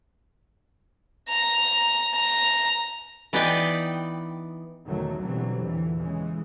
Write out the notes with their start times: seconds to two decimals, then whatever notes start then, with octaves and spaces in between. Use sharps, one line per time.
1.29 A#5
2.16 A#5
3.33 E3 B3 D#4 B4 D5 G5
4.86 B1 E2 D3 D#3 F#3 A3
5.18 B2 D3 E3 F#3 G3 C4
5.64 E2 A#2 D3 E3
5.99 C#3 E3 G#3